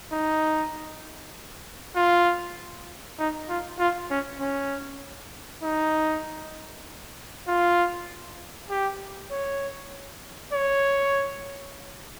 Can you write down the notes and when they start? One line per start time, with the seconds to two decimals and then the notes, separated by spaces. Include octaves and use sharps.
0.12 D#4
1.96 F4
3.19 D#4
3.49 F4
3.79 F4
4.10 C#4
4.40 C#4
5.63 D#4
7.47 F4
8.70 G4
9.31 C#5
10.53 C#5